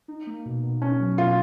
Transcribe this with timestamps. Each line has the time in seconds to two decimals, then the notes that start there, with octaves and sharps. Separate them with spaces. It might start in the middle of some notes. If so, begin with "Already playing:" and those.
0.08 D#4
0.27 A#3
0.46 B2
0.63 B2
0.81 B2 C#4
1.00 F#3
1.18 B2 F4